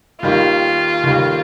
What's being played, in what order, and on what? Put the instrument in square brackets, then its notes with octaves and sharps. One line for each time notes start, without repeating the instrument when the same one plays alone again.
[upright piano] D#2 D#3 G3 [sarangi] F4
[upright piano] D#2 D#3 G3